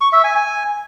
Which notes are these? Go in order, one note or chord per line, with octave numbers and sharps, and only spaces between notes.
C#6
E5
G#5
G#5